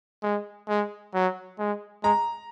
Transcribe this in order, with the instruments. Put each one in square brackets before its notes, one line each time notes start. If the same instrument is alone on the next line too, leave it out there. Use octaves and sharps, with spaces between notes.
[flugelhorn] G#3
G#3
F#3
G#3
[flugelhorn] G#3 [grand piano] A#5